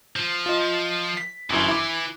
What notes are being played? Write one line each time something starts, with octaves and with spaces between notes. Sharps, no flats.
F3
F4 D#5
B6
G1 F#2 E3 E4
E4 D6